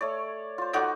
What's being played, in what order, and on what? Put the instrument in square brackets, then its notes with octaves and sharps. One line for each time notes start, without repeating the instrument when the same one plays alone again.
[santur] A3 C#5 D5
F4 C5
[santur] D#4 F#4 D6 [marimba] A4 D5 F#5